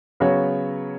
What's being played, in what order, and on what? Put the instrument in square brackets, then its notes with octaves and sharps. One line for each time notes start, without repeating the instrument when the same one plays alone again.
[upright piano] C#3 F#3 B3 F#4 C#5